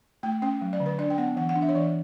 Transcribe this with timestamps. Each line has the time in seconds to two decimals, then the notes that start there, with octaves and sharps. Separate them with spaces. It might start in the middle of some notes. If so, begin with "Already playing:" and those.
0.23 A3 G5
0.42 C#4 G5
0.61 F#3
0.73 D5
0.80 D3
0.86 B4
0.98 D4 D5
1.10 G5
1.18 B3 F#5
1.36 E3 F#5
1.49 F#5
1.56 D4
1.62 E5
1.69 C#5
1.75 E3 D5